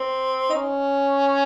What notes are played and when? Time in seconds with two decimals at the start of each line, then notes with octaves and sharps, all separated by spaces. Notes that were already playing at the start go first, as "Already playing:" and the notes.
Already playing: C4
0.50 D#4
0.54 C#4